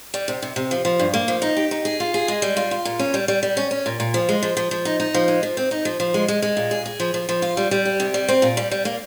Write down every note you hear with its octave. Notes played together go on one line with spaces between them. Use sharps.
G3
C3
C3
C3
F3
F3
G2
A#3
F3
D#4
G4
D#4
G#4
F4
G#4
G#3
G3
F4
F4
A#2
C#4
G3
G3
G3
C#4
C#4
A#2
A#2
F3
G#3
F3
F3
F3
D#4
D#4
F3
G#3
F3
C4
D#4
F3
F3
G#3
G#3
G#3
A#2
G#4
G#4
F3
F3
F3
F4
G3
G3
G4
C3
G3
C4
A#2
G3
G3
A#3